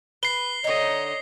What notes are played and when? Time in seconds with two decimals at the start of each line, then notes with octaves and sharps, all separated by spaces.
0.23 B4 C7 G7
0.64 D3 D#4 C#5 D#5